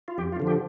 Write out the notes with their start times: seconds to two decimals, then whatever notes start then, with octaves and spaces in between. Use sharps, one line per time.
0.08 F4
0.18 F2 G4
0.32 F4
0.40 D3 F3
0.47 G4